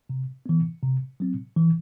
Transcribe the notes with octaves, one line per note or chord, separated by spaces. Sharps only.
C3
E3 B3
C3
F#3 C4
E3